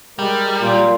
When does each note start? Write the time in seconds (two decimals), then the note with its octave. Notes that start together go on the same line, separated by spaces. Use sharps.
0.19 G3 G#3 A#4
0.61 A#2 F4